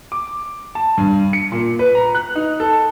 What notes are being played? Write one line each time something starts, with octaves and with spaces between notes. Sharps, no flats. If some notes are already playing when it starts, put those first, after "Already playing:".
D6
A5
G2
C#7
A#2
B4
A#5
F#6
D#4
A4